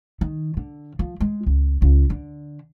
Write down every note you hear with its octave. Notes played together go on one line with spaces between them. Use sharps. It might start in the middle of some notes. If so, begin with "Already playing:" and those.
D#3
D3
F3
G#3
C#2
C#2
D3